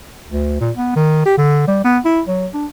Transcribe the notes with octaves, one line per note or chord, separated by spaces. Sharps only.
D2
A#2
B3
D#3
G4
D3
G3
B3
E4
F#3
D4